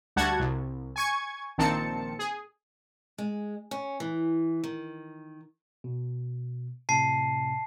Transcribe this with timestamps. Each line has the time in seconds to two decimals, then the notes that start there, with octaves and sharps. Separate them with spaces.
0.16 D2 G3 F#4 F#5 A5 G#6
0.40 C2
0.96 G#5 C#6 G#6
1.58 A#1 A#2 D#3 C4 A5 C#7
2.19 G#4
3.18 G#3
3.71 C#4
4.00 E3
4.64 D#3
5.84 B2
6.89 A2 C3 A5 C7